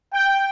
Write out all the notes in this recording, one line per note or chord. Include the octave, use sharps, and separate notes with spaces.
G5